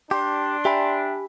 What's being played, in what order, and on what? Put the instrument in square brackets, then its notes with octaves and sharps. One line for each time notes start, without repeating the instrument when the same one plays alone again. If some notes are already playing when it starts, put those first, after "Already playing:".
[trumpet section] D4 [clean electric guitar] G4 [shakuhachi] C6
[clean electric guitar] G4 G#5 B5 [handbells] E5 G5